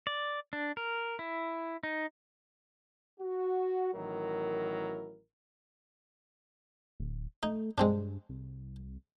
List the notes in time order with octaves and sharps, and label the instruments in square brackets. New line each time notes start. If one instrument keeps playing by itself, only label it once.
[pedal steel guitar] D5
D4
A#4
E4
D#4
[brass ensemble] F#4
A1 D#3 F#3 E4 A#4
[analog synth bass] D1
[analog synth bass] A3 [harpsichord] D#4
[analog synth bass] G2 [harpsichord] G#3 C4 D4
[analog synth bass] C2